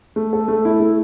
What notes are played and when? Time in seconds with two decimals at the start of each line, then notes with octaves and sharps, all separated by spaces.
0.16 A3
0.33 A4
0.48 A3
0.65 E4
0.80 A3